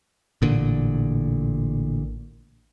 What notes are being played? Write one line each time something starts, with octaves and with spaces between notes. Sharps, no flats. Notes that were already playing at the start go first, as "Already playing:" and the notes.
A1 A#2 D3